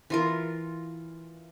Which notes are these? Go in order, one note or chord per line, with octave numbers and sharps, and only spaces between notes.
E3 F4 A#4